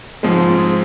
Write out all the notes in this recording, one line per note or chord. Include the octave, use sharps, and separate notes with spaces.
G#2 F3 G#3 C4
D#4
F4
C4
G#4
C4